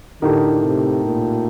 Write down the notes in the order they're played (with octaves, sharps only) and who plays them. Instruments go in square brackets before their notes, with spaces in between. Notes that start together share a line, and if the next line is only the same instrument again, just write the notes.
[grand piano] A2 A3 D#4 G4 A#4 [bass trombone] D3
[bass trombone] C3
A#2